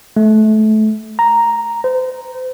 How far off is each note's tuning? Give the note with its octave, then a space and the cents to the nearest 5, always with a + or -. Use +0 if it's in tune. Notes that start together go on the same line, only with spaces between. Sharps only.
A3 -25
A#5 +0
C5 -35